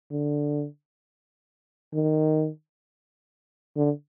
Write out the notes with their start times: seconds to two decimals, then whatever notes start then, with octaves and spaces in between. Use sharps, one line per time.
0.11 D3
1.94 D#3
3.76 D3